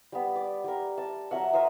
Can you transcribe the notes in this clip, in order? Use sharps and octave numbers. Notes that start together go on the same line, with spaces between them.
G3 B3
D5
G3 A#4
A5
F#3 A#4 E5 F#5
A#4 C5 E5 D#6